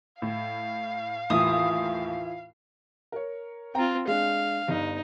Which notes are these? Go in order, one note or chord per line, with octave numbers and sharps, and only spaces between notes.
A2 F5
D#2 A2 E3 E4 F4 D#6
A#4 C#5
C4 F4 G5 A#5
G#3 D4 F5
G1 D#4